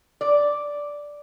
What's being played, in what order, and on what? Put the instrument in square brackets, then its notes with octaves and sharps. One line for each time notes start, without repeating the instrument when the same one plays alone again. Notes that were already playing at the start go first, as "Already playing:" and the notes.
[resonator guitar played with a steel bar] D5